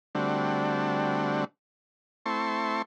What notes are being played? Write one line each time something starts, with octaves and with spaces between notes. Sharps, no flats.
D3 G3 A3 C4 D4 F#4
A3 C4 E4 A5 C6 C#6